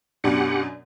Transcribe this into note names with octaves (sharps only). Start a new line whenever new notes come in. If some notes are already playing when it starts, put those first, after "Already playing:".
F#2 B2 D4 G4 F#5